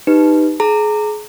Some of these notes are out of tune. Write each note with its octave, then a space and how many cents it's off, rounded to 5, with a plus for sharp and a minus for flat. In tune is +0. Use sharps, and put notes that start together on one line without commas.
D#4 -5 G4 +0 B4 +0
G#4 +30 A#5 -25